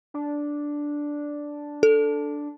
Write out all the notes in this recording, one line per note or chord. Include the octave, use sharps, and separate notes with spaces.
D4
A4